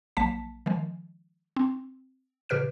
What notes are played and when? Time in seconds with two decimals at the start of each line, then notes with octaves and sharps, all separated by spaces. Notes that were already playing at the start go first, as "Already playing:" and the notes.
0.17 A#1 F#3 A#3 A5 B6
0.66 D#3 F3 G#3
1.56 C4
2.49 A#2 C#3 G4 B4 F6 D7